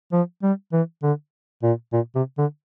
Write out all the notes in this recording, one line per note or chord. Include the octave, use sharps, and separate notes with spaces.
F3
G3
E3
D3
A#2
A#2
C3
D3